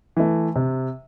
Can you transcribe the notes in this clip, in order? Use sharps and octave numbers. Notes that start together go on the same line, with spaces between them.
E3 A3
C3